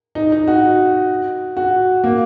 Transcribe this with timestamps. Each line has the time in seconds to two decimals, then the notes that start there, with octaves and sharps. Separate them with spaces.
0.15 D#4
0.32 D#4
0.48 F#4
1.57 F#4
2.04 A#3